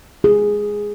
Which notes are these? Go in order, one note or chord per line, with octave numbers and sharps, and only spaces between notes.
G#4